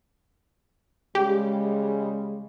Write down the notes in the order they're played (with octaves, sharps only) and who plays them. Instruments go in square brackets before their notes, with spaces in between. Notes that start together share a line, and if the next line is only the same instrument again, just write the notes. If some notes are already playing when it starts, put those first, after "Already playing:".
[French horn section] C#3 G3 G#3 [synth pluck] G4